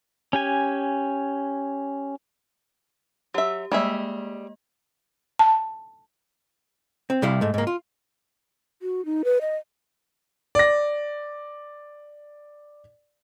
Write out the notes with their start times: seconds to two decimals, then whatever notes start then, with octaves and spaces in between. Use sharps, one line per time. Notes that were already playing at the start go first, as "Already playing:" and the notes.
0.33 C#4 G4 G#5
3.34 F#3 G4 E5
3.72 G3 G#3 A#3 G#4 D#5 E5
5.39 A5
7.10 C4
7.22 C3 G3 E4 F5
7.41 G#2 A3
7.54 G#2 A#3
7.67 F4
8.82 F#4
9.05 D#4
9.25 B4
9.41 D#5
10.55 D5 A#6